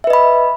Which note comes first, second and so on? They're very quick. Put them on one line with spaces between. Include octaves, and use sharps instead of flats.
E5 B4 D#5 B5